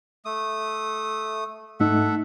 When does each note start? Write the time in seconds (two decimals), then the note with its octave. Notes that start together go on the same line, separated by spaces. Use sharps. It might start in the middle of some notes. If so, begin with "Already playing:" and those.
0.25 A3 D#6
1.80 G#2 A3 D#4 A4 E5 F#5